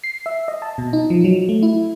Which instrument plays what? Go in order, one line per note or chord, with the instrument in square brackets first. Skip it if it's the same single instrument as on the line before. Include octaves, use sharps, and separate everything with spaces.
[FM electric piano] C7
E5
D#5
A5
B2
D#4
F3
F#3
A3
E4